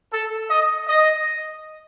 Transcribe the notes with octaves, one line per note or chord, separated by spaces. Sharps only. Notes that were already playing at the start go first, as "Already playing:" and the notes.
A4
D#5
D#5